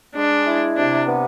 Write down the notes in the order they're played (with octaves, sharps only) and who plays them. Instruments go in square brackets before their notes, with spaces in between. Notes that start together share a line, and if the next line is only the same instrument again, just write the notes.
[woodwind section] G#3 [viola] D4
[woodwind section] E4
[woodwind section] C3 [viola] D4
[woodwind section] B3